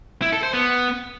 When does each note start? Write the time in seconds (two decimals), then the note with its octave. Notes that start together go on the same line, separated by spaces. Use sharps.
0.22 E4
0.33 A4
0.43 C5
0.53 B3